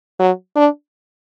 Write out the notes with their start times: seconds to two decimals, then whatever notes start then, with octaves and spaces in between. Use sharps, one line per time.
0.20 F#3
0.56 D4